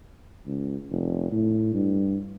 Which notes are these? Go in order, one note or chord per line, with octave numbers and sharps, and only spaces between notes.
C#2
F1
A2
G2